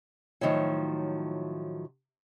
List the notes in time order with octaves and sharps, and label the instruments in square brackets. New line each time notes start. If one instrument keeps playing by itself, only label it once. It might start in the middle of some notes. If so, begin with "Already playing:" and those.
[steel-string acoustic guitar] A2 D#3 F3 F#3